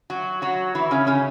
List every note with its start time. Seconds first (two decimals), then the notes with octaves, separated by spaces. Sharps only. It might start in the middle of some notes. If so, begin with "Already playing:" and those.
0.10 F#3 F#4
0.42 F#3 F#4
0.75 E3 E4
0.91 C#3 C#4
1.07 C#3 C#4